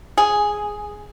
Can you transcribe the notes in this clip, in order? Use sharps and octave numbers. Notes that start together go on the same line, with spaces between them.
G#4